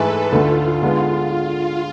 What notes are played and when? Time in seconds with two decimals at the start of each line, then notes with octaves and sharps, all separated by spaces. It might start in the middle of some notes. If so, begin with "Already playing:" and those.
Already playing: G#2 E3 A3 E4 G#4 A4 B4
0.32 D2 D3 A3 F4
0.83 D3 G#3 B3